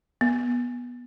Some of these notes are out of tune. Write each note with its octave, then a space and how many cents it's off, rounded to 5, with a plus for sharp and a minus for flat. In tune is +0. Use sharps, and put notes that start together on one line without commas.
B3 -15